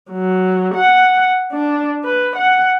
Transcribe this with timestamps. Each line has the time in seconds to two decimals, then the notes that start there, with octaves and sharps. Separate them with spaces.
0.11 F#3
0.74 F#5
1.52 D4
2.04 B4
2.36 F#5